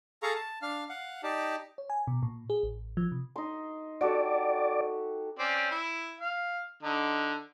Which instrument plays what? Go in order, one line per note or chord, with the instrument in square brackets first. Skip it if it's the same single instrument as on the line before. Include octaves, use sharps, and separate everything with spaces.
[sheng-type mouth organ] G#4 A4 F5 A#5 C#6
A5
D4 F5 F6
F5 F#5
D#4 G4 D5 A5
[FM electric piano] C#5
G#5
B2
A#2
G#4
A1
F3
C3
[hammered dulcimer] D#4 C6
[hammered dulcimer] F#4 G4 A4 [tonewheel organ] D5
[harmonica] C4 C#4 D5
E4
F5
D3 D#4